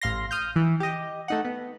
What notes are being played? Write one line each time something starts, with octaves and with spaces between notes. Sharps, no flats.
A1 F5 C6 A#6
D#6 F6 G6
E3
G4 D#5
A3 D#4 F#5
B3